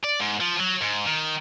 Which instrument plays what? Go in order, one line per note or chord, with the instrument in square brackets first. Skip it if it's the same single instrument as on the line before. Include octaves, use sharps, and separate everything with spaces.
[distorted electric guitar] D5
G#2
F3
F#3
G#2
D#3